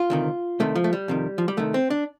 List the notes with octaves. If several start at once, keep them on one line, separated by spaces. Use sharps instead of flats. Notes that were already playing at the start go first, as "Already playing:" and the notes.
Already playing: F4
D2 C3 D#3
C2 C3 D#3 A3
F3
A3
G3
F2 C3 D#3
F3
G3
C2 C3 D#3 A3
C4
D4